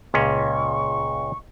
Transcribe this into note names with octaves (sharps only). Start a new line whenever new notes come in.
C#2 A#2 C#4 C#6